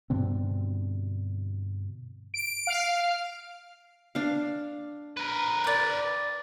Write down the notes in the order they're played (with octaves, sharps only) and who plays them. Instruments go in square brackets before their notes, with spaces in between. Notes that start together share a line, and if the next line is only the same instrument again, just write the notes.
[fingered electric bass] G2 B2 D3 C4
[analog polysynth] D7
F5
[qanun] D4 F5
[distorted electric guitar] A#4 B4
[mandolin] D5 G5